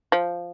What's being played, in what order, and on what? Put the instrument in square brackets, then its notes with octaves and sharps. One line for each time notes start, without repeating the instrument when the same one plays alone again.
[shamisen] F3